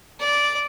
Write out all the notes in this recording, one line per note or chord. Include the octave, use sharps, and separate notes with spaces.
D5